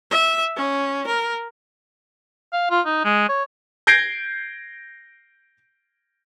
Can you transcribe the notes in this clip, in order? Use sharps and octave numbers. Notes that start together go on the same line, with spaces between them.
E5
C#4
A#4
F5
F4
D#4
G#3
C#5
G6 G#6 A#6 C7 D7 G7